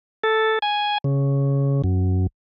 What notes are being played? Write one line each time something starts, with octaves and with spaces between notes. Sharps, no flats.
A4
G#5
C#3
F#2